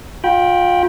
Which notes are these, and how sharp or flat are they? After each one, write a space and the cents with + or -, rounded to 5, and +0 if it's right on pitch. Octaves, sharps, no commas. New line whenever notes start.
F4 +30 G5 +0 B5 -25